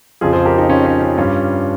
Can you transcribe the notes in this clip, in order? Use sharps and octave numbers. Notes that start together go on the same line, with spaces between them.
F2 C#3 F3 F4 G#4
G#4 C5
G4 A#4
D#4 G4
C#4 F4
C#4
C#4
G2 G3 C#4 F4